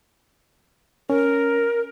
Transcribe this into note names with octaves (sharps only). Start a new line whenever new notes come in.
C#4 A#4